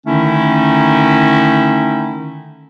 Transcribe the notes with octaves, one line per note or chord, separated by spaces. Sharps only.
D3 D#3 A3 C#4 D#4 E4